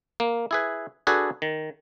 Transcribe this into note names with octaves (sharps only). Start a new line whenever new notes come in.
A#3
E4 G#4 B4
D4 F#4 G#4 A4 B4
D#3